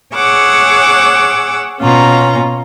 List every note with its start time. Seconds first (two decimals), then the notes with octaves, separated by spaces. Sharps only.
0.14 G#4 C#5 F#5 D6 E6
1.81 B2 C#4 F4 A#5